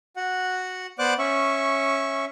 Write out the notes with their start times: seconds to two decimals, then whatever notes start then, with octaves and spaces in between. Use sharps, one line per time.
0.16 F#4 F#5
0.99 B3 C5 D5 F#5 D6 F#6
1.19 C#4 E5 C#6